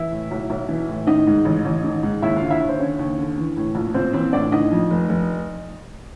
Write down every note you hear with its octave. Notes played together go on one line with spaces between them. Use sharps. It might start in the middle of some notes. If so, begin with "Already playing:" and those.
Already playing: E3 E4 E5
A2
B1
B1
E3
A2
D#3 D#4 D#5
G#2
A1
A1
D#3
G#2
D#2 E4 E5
D3 F4 F5
E4 E5
D#2
C5
D3 C#4 C#5
D#2
D3
E3
A2
A#1
A#1 C4 C5
E3 C4 C5
A2 D4 D5
D3 D#4 D#5
F2
F1
F1